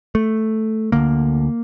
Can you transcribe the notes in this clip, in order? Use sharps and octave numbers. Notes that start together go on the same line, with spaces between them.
A3
D2 D3 A#3